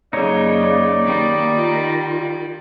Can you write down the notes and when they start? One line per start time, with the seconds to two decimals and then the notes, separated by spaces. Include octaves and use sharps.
0.13 F#2 C#3 A#3 D#4 C#5 D5
1.04 D#3 G3
1.56 F4